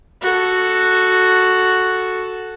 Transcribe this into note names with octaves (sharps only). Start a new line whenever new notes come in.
F#4 A4